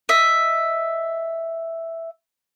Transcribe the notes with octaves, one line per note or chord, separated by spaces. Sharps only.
D#5 E5